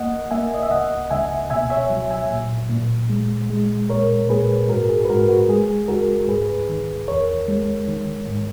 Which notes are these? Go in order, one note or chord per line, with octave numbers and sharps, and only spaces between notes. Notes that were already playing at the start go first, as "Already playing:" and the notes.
Already playing: A#3 D#5 F#5
A#3 E5 G#5
D#5
E5
C#2 D#5 F#5
C#2 E5 G#5
B2 E5 G#5
C#5 E5
F#3
E5 G#5
A#2
A#2
G#3
G#3
A#2 A#4 C#5
A#2 G#4 B4
G#2 F#4 A#4
G#4
B4
G#2 F#4 A#4
F#4
G#3 G#4
C#2 F#4 A#4
G#2 G#4 B4
D#3
E2 A#4 C#5
G#3
D#3
G#2